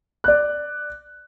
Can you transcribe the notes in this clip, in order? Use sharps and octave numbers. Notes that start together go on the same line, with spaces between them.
D5 F#6